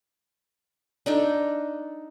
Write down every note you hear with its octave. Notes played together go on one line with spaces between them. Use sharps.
D4 D#4 A4